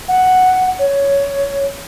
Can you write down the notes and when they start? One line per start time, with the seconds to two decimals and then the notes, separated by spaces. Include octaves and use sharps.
0.08 F#5
0.79 C#5